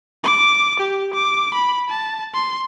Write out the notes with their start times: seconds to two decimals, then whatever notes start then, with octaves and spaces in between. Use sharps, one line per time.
0.24 D6
0.80 G4
1.14 D6
1.54 B5
1.90 A5
2.34 C6